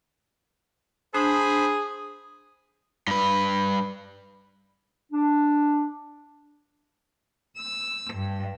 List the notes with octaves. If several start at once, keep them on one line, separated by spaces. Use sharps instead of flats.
D4 G#4 C5 B5 D#6
G2 B4
D4
E6
G2